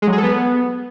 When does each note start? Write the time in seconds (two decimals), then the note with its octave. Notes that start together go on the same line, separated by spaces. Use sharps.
0.02 G#3
0.07 F#3
0.12 G#4
0.18 A4
0.23 B3